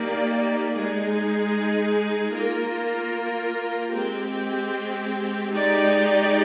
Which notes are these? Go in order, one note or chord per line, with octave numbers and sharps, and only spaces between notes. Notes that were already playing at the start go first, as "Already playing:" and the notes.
Already playing: A#3 D#4 G4 D5
G#3 D#4 G#4
A#3 F4 A#4
G#3 C4 G4
G#3 D#4 G4 D5